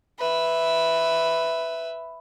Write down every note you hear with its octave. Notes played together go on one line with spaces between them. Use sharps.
B4 E5